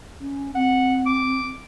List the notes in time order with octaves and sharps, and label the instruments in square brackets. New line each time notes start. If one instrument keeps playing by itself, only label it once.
[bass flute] C#4
[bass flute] C4 [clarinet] F#5
[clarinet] D6